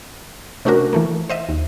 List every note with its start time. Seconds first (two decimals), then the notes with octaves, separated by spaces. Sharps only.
0.65 C3 A3 C#4 D4 F#4 A#4
0.93 E3 A3 A#3
1.29 C5 D#5 E5
1.49 D#2